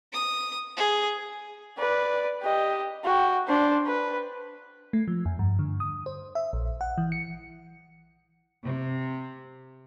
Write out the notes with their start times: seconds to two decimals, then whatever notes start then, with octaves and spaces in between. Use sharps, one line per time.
0.13 D#6
0.77 G#4
1.78 B4 D5
2.42 G4 D#5
3.04 F#4 G5
3.47 D4 C5
3.86 B4
4.93 A3
5.08 F3
5.25 F2
5.39 G2
5.59 D3
5.80 D#6
6.06 C5
6.35 E5
6.53 A#1
6.81 F#5
6.98 E3
7.12 C#7
8.64 C3